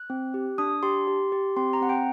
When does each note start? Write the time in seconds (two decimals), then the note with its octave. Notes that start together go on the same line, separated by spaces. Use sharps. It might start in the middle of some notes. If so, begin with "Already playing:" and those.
Already playing: F#6
0.10 C4
0.34 G4
0.58 D4 D#6
0.83 G4 C6
1.07 G4
1.32 G4
1.56 C4 C6
1.73 A#5
1.81 C4 F#5
1.89 G5